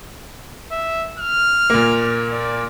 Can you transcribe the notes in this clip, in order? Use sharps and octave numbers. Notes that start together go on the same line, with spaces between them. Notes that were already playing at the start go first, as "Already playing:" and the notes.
E5
F6
A#2 A#3
D5